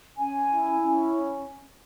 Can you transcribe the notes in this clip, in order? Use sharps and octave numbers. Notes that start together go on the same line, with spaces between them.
C#4 G#5
E4
C#4